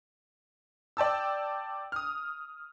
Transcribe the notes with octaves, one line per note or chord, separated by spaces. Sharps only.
D5 G5 A5 E6
D#6 F6